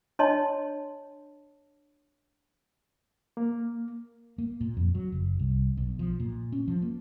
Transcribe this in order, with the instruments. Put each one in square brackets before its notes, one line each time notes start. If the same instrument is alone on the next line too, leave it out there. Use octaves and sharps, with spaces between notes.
[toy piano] D4 C#5 D#5 A5 C6
[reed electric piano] A#3
[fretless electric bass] A#3
A#2
F2
F#3
F#1
C2
B1
F3
A#2
C#4
F3
A#3